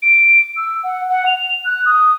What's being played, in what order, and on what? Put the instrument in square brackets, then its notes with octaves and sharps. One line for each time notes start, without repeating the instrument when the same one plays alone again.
[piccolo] D7
E6
F#5
F#5
F7
F#6
D#6